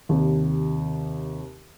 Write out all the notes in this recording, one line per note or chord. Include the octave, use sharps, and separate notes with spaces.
D#2 C3